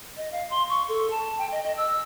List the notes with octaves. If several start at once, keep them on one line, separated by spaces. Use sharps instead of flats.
D#5
F5
C6
C#6
A4
A5
G5
D#5
D#5
E6